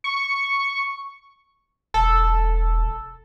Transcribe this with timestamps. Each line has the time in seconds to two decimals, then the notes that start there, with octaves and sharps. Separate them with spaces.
0.04 C#6
1.94 E1 A4